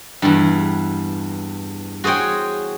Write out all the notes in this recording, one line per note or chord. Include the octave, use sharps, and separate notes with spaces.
E2 G2
F#4 G#4 C5 C#5 G5